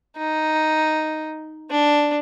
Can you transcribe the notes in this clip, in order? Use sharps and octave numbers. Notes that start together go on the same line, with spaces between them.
D#4
D4